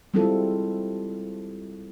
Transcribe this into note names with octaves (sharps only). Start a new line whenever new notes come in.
G3 G#3 C4 E4 F4 A4